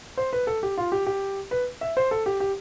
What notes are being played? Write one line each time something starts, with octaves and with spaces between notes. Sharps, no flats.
C5
B4
A4
G4
F4
G4
G4
B4
E5
C5
A4
G4
G4